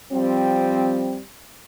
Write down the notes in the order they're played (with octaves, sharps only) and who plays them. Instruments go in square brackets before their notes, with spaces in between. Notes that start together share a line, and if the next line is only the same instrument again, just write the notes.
[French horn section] F3 G3 C4